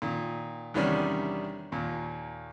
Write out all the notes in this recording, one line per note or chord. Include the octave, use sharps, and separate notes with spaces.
A#2 D#3
E2 C3 D#3 G3 C#4 D4
D#2 A#2